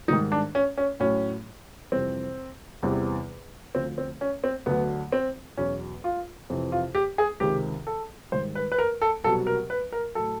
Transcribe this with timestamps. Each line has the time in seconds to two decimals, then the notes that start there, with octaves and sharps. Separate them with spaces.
0.08 G#2 D#3 G3 D#4
0.32 D4
0.55 C#4
0.78 C#4
1.00 A2 F#3 C#4
1.92 F2 C3 E3 G3 C4
2.83 E2 C3 E3 G3
3.75 D2 D3 F3 C4
3.98 C4
4.21 C#4
4.44 C4
4.66 D2 D3 F#3 B3
5.12 C4
5.57 E2 B2 F#3 C#4
6.04 F4
6.50 F2 C3 E3
6.72 F4
6.95 G4
7.18 G#4
7.40 C#2 C3 D#3 G4
7.87 A4
8.32 G#2 D#3 G3 C5
8.55 B4
8.72 B4
8.78 A#4
9.02 A4
9.24 C2 B2 F#3 A4
9.47 A#4
9.70 B4
9.92 A#4
10.15 A2 F#3 A4